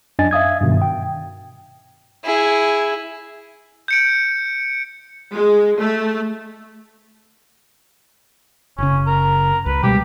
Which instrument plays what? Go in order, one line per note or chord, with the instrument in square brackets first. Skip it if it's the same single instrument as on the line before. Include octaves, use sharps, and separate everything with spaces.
[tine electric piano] F#2 D4 D#5 G#5 A6
E5 F5 D#6 G#6
G2 B2 D#3
G5
[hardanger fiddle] E4 G#4
[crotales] G6 C#7 D7
[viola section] G#3
A3
[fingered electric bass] F#1 C#3 [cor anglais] C#4
[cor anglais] A#4
[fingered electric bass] C#2 [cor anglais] B4
[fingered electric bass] B2 G3 G#3 [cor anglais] G4